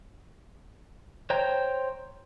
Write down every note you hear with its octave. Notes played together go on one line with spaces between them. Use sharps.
C5 C#5 G5 A#5 G6